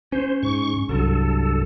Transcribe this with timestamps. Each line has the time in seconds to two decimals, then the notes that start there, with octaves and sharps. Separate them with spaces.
0.12 C#4 C5
0.43 G#2 C#6
0.89 C2 G2 F#3 A4